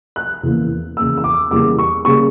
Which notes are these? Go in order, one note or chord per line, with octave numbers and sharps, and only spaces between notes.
F#6
E2 C#3 E3 A#3
E2 C#3 E3 A#3 E6
E6
D6
E2 C#3 G3 A#3 D6
C#6
C#3 G3 A#3 C#6